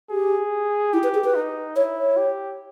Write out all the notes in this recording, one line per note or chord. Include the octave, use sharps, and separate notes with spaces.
G4 G#4
E4 G4
B4
G#4
B4
D#4
E4 C#5
C#5
G4